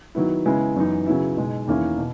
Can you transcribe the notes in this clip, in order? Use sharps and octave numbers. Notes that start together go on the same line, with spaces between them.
D#3 F#3 B3 E4
C#3 G#3 B3 E4
F#2 E3 B3 D#4
C#3 F#3 B3 E4
B2 G#3 D#4
E2 D#3 A#3 C#4 E4
B2